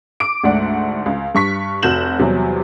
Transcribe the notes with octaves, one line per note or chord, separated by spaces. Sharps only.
D6 D7
D2 G#2 A3 D5 F#5
C#2
G2 C#6 B6
F1 F#4 G6 E7 F#7
E2 C3 F#3 G3